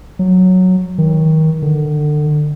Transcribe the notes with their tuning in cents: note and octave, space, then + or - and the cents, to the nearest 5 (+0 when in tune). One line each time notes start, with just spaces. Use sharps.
F#3 -5
D#3 +25
D3 +30